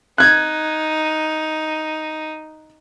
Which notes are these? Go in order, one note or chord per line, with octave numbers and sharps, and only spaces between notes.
D#4 F#6 G#6